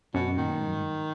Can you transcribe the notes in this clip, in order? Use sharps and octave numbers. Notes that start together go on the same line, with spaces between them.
F#2 B2
A#2 D#3
G#2
F#2
G#2